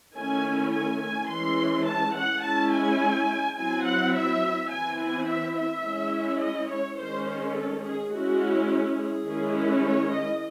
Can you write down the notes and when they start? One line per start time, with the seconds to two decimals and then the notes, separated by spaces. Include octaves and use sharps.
0.16 D#3 A3 C#4 E4 G#5
0.72 G#5
1.01 G#5
1.30 E3 G#3 C#4 C6
1.86 A5
2.15 F#5
2.43 G#3 C#4 E4 A5
2.72 G#5
3.57 F#3 C4 E4 G#5
3.85 F#5
4.14 E5
4.71 E3 C4 E4 G#5
5.00 G#5
5.27 E5
5.57 E5
5.84 G#3 C#4 E4
6.41 D#5
6.69 C#5
6.98 D#3 G#3 C#4 C5
7.27 C5
7.55 A4
7.84 G#4
8.11 G#3 C#4 E4 F#4
8.97 G#4
9.26 D#3 G#3 C#4 E4
9.82 C#5
10.11 D#5